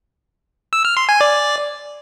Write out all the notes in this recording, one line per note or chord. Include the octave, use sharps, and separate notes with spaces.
E6
F6
C6
G#5
D5